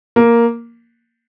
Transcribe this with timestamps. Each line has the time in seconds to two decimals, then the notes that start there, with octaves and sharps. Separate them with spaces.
0.16 A#3